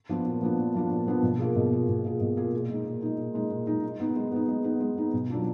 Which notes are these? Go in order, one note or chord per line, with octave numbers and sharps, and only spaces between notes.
F3 B3 D4 F4
A#2
F3 B3 D4 F4
A#2
F3 B3 D4 F4
A#2
F3 B3 D4 F4
B2
A#3 F4 G#4
B2
A#3 F4 G#4
B2
A#3 F4 G#4
B2
A#3 F4 G#4
A#2
G#3 D#4
A#2
G#3 D#4
A#2
G#3 D#4
A#2
G#3 D#4
G#3
B3 D#4
G#3
B3 D#4
G#3
B3 D#4
G#3
B3 D#4
B2
F#3 B3 D4 F4